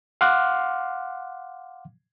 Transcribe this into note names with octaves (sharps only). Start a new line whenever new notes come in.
F5 F#5 C6 D6 F6 F#6